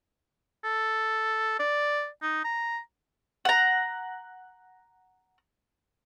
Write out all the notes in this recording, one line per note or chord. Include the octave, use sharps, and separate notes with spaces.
A4
D5
D#4
A#5
F#5 A#5